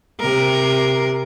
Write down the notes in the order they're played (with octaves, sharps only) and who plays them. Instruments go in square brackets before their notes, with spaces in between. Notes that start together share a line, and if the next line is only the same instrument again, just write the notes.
[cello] C3 A#4